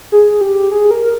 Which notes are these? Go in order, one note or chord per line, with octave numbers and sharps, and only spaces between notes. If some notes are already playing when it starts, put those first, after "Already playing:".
G#4
G4
G#4
A#4